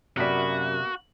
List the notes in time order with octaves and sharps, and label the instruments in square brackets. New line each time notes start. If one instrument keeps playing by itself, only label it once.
[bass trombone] F#2 [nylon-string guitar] C3 D5 [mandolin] A#3 B3 B5 [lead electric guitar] F#4